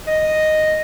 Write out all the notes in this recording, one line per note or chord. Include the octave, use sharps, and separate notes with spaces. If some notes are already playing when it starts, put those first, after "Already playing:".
D#5